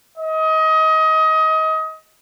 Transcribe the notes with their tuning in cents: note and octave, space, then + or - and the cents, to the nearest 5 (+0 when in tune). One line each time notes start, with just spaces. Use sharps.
D#5 +25